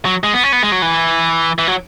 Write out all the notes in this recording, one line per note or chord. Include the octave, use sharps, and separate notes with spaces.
F#3
G#3
B3
C#4
B3
G#3
F#3
E3
E3
F#3